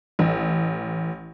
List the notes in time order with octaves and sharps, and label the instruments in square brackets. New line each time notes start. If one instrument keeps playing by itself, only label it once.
[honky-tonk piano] A1